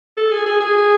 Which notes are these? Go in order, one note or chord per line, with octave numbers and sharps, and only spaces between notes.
A4
G#4
G#4
G#4